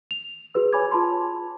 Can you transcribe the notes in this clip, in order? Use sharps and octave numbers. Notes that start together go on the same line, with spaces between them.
F7
F#4 G#4 B4 E6
C#5 G#5 B5 D6 G#6
F4 A5 B5 C6